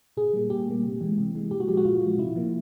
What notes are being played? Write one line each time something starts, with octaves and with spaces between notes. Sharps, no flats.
A#2 G#4
G3 A#3
A#2 G4
G3 A#3
C3
E3 G#3
C3
E3 G#3
A#2 G4
F#4
F3 G#3 G4
F#4
A#2 F4
F3 G#3
C3 E4
F3 A#3